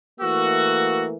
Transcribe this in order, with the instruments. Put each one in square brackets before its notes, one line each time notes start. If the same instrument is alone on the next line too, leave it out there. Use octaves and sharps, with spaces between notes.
[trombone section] E3 A3 A#3 [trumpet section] F#4 [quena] E6